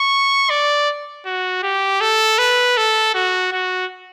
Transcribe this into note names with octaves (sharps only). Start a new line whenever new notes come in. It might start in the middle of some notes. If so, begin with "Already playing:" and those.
Already playing: C#6
D5
F#4
G4
A4
B4
A4
F#4
F#4